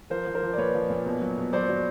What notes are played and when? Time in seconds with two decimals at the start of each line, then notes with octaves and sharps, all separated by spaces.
0.10 F3 A#4 C5
0.27 F3
0.35 A#4 C5
0.43 F3
0.53 D5
0.58 A#2 B4 C#5
0.75 F3
0.90 A#2
1.06 B2
1.21 F#3
1.38 B2
1.53 F#3 C5 D5
1.69 F#3